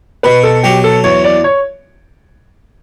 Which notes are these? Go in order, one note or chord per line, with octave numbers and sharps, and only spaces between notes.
B2 B4
A4
F#3 G4
A4
E2 C#5
D5
C#5